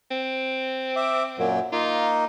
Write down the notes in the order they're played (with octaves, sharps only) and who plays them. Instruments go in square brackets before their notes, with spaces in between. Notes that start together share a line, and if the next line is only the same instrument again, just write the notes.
[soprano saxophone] C4
[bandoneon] E5 D6
F#2 A#2 F#3
[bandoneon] A#3 D#4 [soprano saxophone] F4